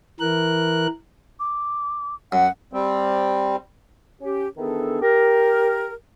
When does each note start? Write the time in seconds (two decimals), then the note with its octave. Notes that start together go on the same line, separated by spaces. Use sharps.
0.20 E3 A#4 F#6
1.40 D6
2.32 F#2 F#5
2.73 G3 C4
4.22 C#4 G4
4.58 D#3 E3 B3 D4 G#4 A4
5.02 G4 A#4